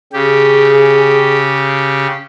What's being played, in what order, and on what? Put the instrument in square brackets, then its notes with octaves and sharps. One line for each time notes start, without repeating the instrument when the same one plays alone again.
[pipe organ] C#3 G4 [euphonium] G#4